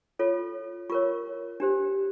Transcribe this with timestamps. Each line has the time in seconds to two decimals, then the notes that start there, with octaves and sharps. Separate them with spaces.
0.19 F4 A4 C#5
0.89 F4 A#4 C#5 C#6
1.60 D4 G4 C5